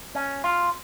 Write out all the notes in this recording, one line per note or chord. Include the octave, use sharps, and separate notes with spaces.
C#4
F4